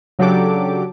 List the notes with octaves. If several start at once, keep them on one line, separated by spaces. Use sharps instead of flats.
C#3 F#3 D4 G4 A4 D6